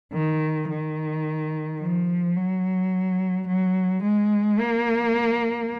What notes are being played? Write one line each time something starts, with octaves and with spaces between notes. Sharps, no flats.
D#3
D#3
F3
F#3
F#3
G#3
A#3